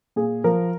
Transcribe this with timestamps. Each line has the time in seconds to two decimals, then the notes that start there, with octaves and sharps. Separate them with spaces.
0.16 A#2 G#4
0.44 F3 A#4